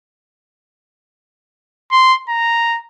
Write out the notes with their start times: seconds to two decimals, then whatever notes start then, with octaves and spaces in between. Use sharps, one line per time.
1.92 C6
2.29 A#5